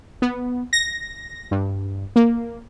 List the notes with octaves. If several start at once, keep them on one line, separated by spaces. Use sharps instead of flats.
B3
A#6
G2
A#3